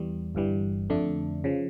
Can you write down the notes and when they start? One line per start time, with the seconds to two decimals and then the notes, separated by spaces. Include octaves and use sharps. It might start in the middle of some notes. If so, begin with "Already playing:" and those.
Already playing: E2 E3 G3
0.35 G1 G2 E3 G3
0.90 F2 D3 A3 D4
1.44 C#3 F3